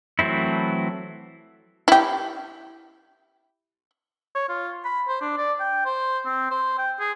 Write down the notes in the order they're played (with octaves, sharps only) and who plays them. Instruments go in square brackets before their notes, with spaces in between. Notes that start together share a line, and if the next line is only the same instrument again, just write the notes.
[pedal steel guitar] E3 F#3 A3 C4 E4
[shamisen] E4 G4
[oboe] C#5
F4
B5
C5
D4
D5
G5
C5
C4
C5
G5
G#4